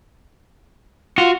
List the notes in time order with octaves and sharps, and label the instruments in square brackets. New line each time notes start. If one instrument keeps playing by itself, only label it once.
[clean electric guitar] F4 [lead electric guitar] F#4